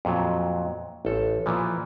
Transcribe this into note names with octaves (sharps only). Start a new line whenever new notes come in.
F2 A#2 F#3
A1 A4
A#2 E3 F3